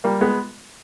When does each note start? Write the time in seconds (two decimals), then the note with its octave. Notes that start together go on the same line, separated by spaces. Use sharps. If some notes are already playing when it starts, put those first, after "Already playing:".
0.04 G3 A#3
0.21 G#3 B3